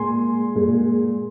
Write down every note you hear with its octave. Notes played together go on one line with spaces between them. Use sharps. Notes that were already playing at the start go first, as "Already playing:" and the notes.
Already playing: A#2 G#3 G#5 C6
A#2 G#3